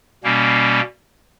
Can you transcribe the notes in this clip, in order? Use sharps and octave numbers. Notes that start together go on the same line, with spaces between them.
B2 G3 A#3 C#4